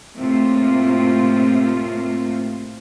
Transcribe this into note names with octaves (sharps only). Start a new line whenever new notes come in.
A2 C3 A3 A#3 F4